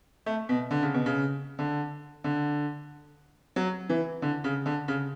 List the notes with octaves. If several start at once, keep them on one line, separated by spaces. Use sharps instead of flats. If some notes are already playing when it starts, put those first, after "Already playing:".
A3
B2
D3
C#3
B2
C#3
D3
D3
F#3
E3
D3
C#3
D3
C#3